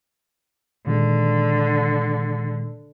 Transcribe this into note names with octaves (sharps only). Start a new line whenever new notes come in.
A#2 D3 D#3 G#3